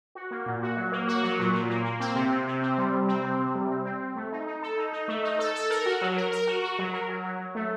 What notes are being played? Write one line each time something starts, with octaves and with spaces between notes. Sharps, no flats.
F#4
A#3
A#2
F#4
F#3
A#3
F#4
F#3
A#2
A#2
A#3
A#3
C4
C3
C3
C3
C4
G3
C3
C4
C3
C3
G3
C4
C4
C4
A3
D#4
D#4
A4
D#4
D#4
A3
D#4
A4
A4
A#4
F#4
F#3
A#4
A#4
F#4
F#4
F#3
A#4
F#3
F#3
F#3
A3